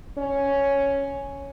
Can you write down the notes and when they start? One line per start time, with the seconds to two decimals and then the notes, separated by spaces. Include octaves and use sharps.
0.18 C#4